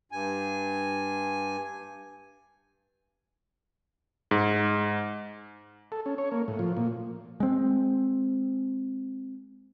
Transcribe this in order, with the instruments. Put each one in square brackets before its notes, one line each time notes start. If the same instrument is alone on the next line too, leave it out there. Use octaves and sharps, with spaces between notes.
[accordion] G2 G#5
[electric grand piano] G#2
[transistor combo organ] A4
C#4
C#5
A#3
A2
F3
A#2
[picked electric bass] G#3 C4